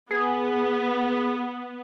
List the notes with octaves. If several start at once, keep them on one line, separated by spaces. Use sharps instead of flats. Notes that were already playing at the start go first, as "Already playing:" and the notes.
B3 G#4